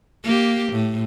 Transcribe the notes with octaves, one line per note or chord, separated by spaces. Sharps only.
A#3 G4
A2